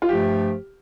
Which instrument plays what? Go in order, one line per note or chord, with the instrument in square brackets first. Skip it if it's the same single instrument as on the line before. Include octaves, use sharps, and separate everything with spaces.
[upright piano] F4
[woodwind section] G2 F3 A3 [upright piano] G4